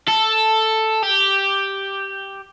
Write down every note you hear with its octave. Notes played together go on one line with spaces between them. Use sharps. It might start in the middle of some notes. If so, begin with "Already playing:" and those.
A4
G4